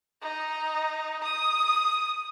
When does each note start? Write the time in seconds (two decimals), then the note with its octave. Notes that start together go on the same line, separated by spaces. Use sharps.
0.22 D#4
1.23 D#6